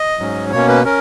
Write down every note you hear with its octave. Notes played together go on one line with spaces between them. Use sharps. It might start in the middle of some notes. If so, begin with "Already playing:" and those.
Already playing: D#5
G#2 F#3 C#4
B2 A#3 C#4 C#5
B4
C#4 A#4